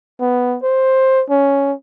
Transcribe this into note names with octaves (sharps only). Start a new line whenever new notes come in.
B3
C5
C#4